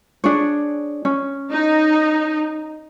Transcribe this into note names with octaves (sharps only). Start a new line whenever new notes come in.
D4 G#4 C#5
C#4
D#4